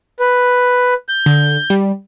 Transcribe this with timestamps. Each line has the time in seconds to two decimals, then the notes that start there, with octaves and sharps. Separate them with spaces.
0.20 B4
1.09 G6
1.26 D3
1.70 G3